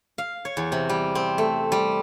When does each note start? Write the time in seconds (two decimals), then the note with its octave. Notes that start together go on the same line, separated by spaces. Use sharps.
0.18 F5
0.45 C#5
0.57 E2
0.72 C3
0.89 G3
1.15 C4
1.38 A3
1.72 G3